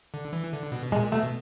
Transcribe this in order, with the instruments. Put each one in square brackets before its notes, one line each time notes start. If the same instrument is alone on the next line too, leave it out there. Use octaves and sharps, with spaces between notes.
[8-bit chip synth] D3
E3
D3
B2
[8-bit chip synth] A#2 [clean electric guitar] G#3
[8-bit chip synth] B2 [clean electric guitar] A3